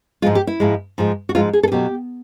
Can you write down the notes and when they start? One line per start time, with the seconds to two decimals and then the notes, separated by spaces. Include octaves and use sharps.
0.22 G#2 F3 G#3 F4
0.35 G4
0.47 E4
0.60 G#2 F3 G#3
0.98 G#2 F3 G#3
1.29 F#4
1.35 G#2 F3 G#3 F4
1.53 G#4
1.63 A4
1.68 G#4
1.72 B2 F#3 A3 G4